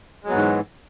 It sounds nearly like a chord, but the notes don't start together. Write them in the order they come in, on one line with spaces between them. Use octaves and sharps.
G#3 F#3 B3 G#2 E3